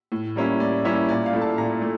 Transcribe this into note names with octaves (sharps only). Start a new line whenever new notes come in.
A2
G3 A#3 C#4 E4
A2 D5
G3 A#3 C#4 E4 E5
A#2 D5
F5
A3 E4
A5
A#2 A#5
A3